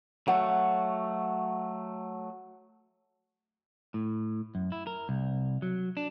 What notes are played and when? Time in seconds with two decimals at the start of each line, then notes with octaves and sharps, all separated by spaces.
0.28 F#3 A3 F#5
3.94 A2
4.55 F#2
4.72 E4
4.87 A#4
5.09 C2
5.62 F#3
5.97 D4